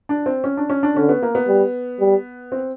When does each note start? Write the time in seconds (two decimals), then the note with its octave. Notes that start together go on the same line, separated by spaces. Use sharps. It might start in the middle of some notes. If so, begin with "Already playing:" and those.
0.09 D4
0.26 C4
0.44 C#4
0.57 D4
0.70 C#4
0.83 D4
0.96 D3 C#4
1.09 B3
1.22 A#3
1.35 B3
1.48 G3
2.00 G3
2.52 C4